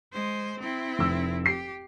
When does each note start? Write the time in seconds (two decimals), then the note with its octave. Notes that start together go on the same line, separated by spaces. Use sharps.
0.13 G#3 C5
0.60 C4 E4
0.99 F1 E6
1.46 G4 C7